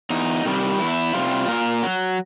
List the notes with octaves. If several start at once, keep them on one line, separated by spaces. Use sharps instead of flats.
E2 D#4
C3 D#3 G3
E2 E4
C3 D#3 G3 F4
A#2 A#4
F#3